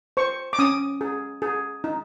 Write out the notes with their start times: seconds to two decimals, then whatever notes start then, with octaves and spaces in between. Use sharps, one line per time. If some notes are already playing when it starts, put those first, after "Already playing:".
0.17 C5 C#6
0.53 D6
0.59 C#4 D#6
1.01 G#4
1.42 G#4
1.84 D#4